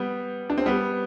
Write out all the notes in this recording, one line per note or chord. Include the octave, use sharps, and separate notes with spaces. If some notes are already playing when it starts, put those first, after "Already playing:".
Already playing: G3 B3
D4
C4
G3 B3